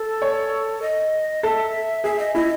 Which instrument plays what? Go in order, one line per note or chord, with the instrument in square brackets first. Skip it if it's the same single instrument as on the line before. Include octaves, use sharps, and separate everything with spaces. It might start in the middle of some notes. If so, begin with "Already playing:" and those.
Already playing: [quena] A4
[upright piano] C#5
[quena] D#5
[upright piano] A4 [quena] E5
[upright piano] G#4 [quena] E5
[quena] D#5
[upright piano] E4 [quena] D#5